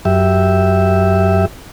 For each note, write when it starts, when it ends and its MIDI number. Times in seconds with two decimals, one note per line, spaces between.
0.05 1.45 42
0.05 1.45 67
0.05 1.45 76